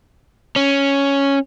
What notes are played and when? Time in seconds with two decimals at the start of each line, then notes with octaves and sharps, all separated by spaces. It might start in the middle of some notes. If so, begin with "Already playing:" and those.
0.56 C#4